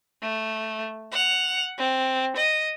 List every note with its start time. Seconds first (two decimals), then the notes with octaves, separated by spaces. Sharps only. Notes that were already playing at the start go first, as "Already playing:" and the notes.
0.22 A3
1.12 F#5 F7
1.78 C4
2.36 D#5